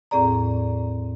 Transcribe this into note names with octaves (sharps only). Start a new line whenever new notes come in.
E2 A2 C4 G#4 D5 A#5